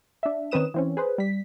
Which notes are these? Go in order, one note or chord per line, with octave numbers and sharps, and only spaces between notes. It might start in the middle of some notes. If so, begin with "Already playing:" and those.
D4 E5
D#3 C4 C#4 B4 D#6 E7
E3 C4 C#4
G#4 B4 C5
G3 B6